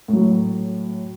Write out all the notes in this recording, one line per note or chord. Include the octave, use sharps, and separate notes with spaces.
A2 F#3